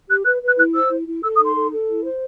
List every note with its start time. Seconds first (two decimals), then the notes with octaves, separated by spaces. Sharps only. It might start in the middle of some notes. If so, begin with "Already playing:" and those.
0.09 G4 F#6
0.25 B4 F#6
0.42 B4 F#6
0.58 E4 F#6
0.74 C5 E6
0.90 E4
1.07 E4
1.23 A4 E6
1.34 D#6
1.39 D#4
1.44 C6
1.55 A4
1.72 A4
1.88 E4
2.05 C5